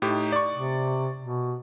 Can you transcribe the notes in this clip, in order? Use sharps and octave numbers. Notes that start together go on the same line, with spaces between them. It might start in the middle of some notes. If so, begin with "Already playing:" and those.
A2 D#4 G4
D5 C#6
C3
B2